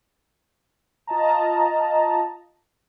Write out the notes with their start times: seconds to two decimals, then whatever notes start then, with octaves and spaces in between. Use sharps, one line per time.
1.07 F4 D#5 A5 A#5